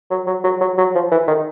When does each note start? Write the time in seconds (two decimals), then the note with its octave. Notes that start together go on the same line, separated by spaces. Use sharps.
0.11 F#3
0.27 F#3
0.44 F#3
0.61 F#3
0.78 F#3
0.95 F3
1.12 E3
1.28 D#3